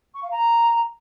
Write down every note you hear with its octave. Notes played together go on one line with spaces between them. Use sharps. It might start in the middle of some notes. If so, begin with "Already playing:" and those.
C#6
F5
A#5